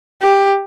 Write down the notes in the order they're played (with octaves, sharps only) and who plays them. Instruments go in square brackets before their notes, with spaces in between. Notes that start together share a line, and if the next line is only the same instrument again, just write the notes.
[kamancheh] G4